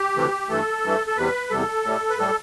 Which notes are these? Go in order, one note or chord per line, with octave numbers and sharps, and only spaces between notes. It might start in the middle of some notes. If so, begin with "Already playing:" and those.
Already playing: G4
D2 C3 E3 A3
G2 E3 A3 A4
G2 E3 A3
A4
E2 C3 G3 B4
E2 C3 G3 A4
A2 G3
B4
A2 G3 A4